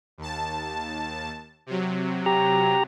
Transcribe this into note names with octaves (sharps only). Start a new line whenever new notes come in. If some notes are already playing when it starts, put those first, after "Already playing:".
D#2 A5
C3 F#3
G4 A#5